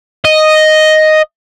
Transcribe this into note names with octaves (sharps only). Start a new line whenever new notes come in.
D#5